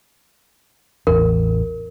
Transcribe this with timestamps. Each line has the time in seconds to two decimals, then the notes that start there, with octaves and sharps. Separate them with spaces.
1.07 A1 E2 A#4